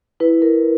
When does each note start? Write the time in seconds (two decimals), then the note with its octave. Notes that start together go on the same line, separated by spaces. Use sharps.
0.20 E4 B4
0.42 A#4